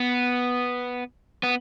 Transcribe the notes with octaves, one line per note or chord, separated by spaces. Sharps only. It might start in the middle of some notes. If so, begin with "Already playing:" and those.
Already playing: B3
B3